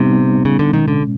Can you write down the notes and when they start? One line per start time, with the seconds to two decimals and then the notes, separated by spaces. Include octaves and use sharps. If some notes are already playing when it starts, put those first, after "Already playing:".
Already playing: C3 G3 B3 D#4
0.45 C#3
0.59 D3
0.73 B2 D#3 G#3 C#4
0.88 D3